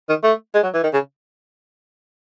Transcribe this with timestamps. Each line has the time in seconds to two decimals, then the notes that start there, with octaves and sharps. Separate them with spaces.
0.09 D#3
0.23 A3
0.54 G#3
0.63 F#3
0.74 E3
0.83 D#3
0.93 C#3